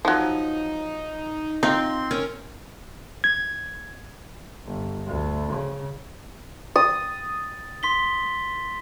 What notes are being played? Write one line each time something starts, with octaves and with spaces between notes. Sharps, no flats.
F3 F#3 D#4
C4 D#4 F4 C6
C#4 A#4
G#6
G1
D2
C#3
D#6 A6
C6 B6 G7